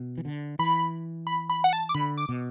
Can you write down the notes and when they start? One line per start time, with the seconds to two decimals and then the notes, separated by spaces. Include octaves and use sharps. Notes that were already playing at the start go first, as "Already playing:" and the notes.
Already playing: B2
0.18 E3
0.25 D3
0.59 E3 B5
1.27 B5
1.50 B5
1.64 F#5
1.73 A5
1.89 D6
1.95 D3 B5
2.17 D6
2.29 B2